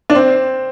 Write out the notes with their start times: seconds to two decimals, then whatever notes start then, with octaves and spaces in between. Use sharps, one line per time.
0.10 D4
0.15 C4